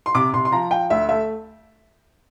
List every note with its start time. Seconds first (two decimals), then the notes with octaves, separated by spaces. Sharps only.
0.06 C6
0.15 C3 D6
0.34 C3 C6
0.45 C6
0.52 F3 A#5
0.71 F3 G5
0.90 D2 E5
1.09 A3 E5